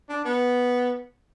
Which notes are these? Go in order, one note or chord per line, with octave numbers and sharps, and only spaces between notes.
D4
B3